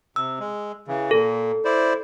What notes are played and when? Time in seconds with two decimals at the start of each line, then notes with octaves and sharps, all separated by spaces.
0.16 C3 E6
0.39 G#3
0.88 C#3 E3
1.11 A#2 A4
1.65 E4 C5 D5